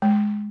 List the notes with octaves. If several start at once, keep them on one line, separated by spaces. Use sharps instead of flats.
G#3